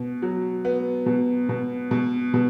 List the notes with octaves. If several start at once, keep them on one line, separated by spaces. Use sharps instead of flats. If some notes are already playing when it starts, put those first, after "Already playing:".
Already playing: B2
F#3
B3
B2
B2
B2
B2